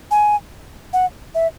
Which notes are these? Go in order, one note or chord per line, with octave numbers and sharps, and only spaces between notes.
G#5
F#5
E5